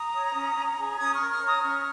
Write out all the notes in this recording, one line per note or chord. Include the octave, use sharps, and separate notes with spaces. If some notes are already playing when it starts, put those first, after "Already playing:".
Already playing: A#5 D#6
C#5
C#4
C#4
G#4
C#4 D#6 G#6
C#6 F6
A#4
C#6 F6
C#5
A#5 D#6
C#4 C#6 F6